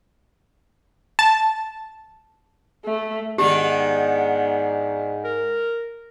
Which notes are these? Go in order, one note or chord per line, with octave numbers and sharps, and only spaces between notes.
A5
A3
G#2 D#3 B3 D4 G4
A#4